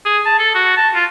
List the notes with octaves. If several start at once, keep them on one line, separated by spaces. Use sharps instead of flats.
G#4
A5
A4
F#4
A5
F4